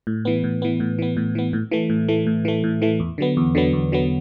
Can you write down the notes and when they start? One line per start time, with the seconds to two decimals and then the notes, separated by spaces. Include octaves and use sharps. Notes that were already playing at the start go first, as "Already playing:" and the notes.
0.07 A2
0.25 E3 B3
0.44 A2
0.62 E3 B3
0.80 A2
0.99 E3 B3
1.17 A2
1.35 E3 B3
1.53 A2
1.71 E3 A3
1.90 A2
2.08 E3 A3
2.27 A2
2.45 E3 A3
2.64 A2
2.82 E3 A3
3.00 E2
3.18 D3 F#3 B3
3.37 E2
3.55 D3 F#3 B3
3.73 E2
3.92 D3 F#3 B3